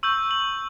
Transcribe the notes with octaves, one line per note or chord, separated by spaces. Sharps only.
C#6 E6 G6 F#7
F#7